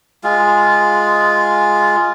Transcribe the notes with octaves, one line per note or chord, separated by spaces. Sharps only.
G#3 F4